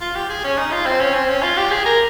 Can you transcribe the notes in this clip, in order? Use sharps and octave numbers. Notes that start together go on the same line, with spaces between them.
F4
G4
G#4
C#4
D#4
F4
C4
C#4
C4
C#4
F4
G4
G#4
A#4